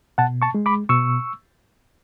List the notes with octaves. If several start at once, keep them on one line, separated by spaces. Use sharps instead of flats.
B2 F#5 A5
A5 C#6
G#3
B5 D6
B2 C#6 E6